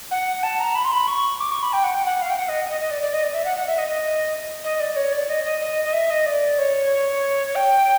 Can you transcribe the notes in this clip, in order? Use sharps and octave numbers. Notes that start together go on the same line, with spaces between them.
F#5
A5
A#5
B5
C6
B5
C#6
D6
C#6
B5
G5
F#5
G5
F#5
F5
G5
F#5
D#5
D#5
D#5
D5
D5
D#5
D5
E5
F#5
F#5
E5
D#5
D#5
D#5
D5
C#5
D5
D#5
D#5
D#5
D#5
E5
D#5
D5
C#5
G5